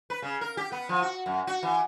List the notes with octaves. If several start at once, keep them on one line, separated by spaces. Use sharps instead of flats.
B4
C#3
A#4
G4
B3
F3
F#4
F#2
F#4
E3